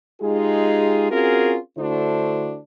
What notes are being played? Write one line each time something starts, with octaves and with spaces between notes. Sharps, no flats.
G#3 D#4 F4 G4 G#4
C4 C#4 F4 F#4 G#4 A#4
D3 A3 D4 E4 F#4 C5